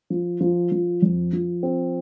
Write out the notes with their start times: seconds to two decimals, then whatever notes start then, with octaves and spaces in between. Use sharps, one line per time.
0.10 F3
0.41 F3
0.72 F3
1.02 F2
1.33 F3
1.63 C4